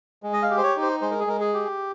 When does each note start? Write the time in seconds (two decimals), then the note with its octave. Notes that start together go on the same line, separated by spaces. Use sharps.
0.23 G#3
0.33 D#5
0.43 F5
0.50 G4
0.58 C5
0.63 C#5
0.76 D#4
0.82 C5
1.01 G#3 C5
1.11 A#4
1.20 G#4
1.27 G#3 A#4
1.40 G#4
1.54 G4